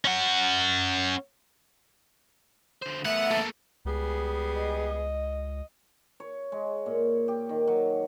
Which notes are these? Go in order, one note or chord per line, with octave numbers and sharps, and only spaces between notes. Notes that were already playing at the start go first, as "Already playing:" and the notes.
C#4 F#5
D3 C5
A3 B3 E5 F#5
A#3 A4
C#2 G3 B3 G#4
D#5
C#5
G#3
A#2
G4
D#3
F#3